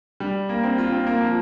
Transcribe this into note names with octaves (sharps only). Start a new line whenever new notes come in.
G3
A#3
C4
F4
C4
A#3
F3